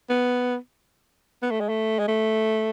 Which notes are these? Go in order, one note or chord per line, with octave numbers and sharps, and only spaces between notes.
B3
B3
A3
G#3
A3
G#3
A3